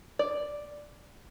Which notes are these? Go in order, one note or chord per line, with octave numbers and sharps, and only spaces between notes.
D5